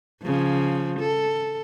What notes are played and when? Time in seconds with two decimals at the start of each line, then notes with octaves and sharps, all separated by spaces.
0.23 C#3 F3
1.00 A4